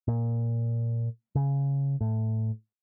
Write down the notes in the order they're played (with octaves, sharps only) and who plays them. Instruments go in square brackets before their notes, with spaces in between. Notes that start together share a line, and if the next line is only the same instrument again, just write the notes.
[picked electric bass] A#2
C#3
A2